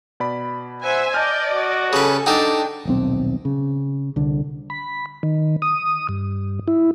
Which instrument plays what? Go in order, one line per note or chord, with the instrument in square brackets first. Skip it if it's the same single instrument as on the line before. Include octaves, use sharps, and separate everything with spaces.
[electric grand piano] B2 D5 B5
[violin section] C5 E5 G#5 [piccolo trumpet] F#5
[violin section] D5 D#5 [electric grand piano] A5 F6 [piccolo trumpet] G6
[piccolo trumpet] F#4
[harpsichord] C#3 B4 [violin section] G4 A4 G#5
[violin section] D4 [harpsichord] D#4 A4 [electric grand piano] F#5 G5 A5 [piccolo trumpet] D6
[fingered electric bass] D#1 B1 C4
C#3
C2 D3
[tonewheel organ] B5
D#3
D#6
G2
E4